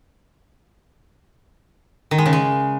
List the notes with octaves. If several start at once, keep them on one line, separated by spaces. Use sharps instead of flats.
D#3
G#3
C#3
G#3